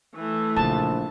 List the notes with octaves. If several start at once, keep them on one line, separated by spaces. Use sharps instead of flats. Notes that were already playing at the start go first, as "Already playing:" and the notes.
E3 A3
A#1 C#3 A5